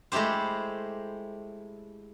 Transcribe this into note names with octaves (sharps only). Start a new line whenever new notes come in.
G#3 A3 E4 G4 C5